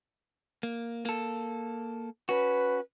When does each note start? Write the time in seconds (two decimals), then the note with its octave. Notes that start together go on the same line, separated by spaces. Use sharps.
0.63 A#3
1.05 A#3 A4
2.29 C#4 F#4 B4